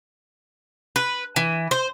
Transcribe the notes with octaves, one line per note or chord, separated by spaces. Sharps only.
B4
E3
C5